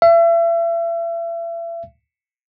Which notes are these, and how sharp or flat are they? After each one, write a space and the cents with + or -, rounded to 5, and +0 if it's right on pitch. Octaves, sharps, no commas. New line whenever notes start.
E5 +35